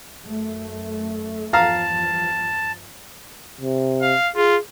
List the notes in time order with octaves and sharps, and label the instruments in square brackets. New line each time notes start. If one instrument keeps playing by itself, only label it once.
[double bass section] F#2 A3
[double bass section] E2 G2 F3 [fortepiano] F5 A#5 [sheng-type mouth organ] A5
[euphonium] C3
[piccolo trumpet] F5
[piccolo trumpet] F4 [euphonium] G#4